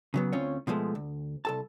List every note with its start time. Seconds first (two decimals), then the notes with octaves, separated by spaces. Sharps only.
0.14 C#3 F#3 B3
0.33 D2 C4 C#4 F4 C#5
0.67 B2 F3 G#3 A3
0.95 D2
1.45 C2 A4 A5